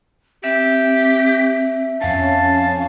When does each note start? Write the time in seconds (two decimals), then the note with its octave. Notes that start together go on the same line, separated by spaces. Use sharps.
0.44 C4 G4 E5
2.01 F2 C#4 F5 A5